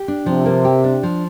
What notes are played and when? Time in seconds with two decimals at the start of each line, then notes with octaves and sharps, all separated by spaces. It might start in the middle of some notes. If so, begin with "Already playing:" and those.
Already playing: G4
0.08 D4
0.26 C3 F3
0.46 A#3
0.65 G4
0.84 D4
1.03 F3